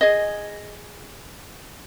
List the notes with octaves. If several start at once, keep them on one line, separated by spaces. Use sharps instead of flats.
G#4 D#5